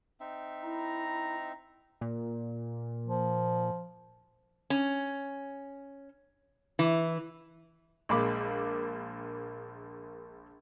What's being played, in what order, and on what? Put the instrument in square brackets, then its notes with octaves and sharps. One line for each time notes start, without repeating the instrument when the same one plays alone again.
[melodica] C4 D#4 E5
[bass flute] E4 [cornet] A#5
[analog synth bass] A#2
[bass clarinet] F3
[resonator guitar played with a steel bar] C#4
E3
[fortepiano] A#1 G#3 A#3 B5 D6